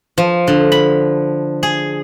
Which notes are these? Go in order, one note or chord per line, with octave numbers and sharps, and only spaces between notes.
F3
D3
B5
G#4